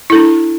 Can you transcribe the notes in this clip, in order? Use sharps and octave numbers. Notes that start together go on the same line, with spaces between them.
D4 E4 A4